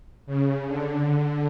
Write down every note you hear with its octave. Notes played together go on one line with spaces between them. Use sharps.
C#3
D3